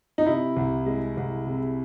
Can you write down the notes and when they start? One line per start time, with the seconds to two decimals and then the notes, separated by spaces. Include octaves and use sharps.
0.18 D#4
0.26 C3 E4
0.56 C2
0.86 G#3
1.17 C2
1.47 C3